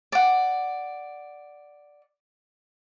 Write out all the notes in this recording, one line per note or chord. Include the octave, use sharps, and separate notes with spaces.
D5 F#5